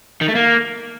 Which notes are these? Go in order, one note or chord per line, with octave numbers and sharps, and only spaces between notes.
D#3
A3
A#3